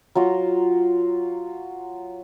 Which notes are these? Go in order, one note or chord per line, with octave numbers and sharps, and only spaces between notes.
F#3 F4 A#5